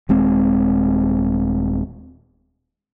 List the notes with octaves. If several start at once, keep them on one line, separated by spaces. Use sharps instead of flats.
D#1 G#3 C4